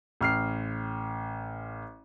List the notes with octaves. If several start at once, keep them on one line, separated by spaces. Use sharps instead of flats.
A1 F6 C7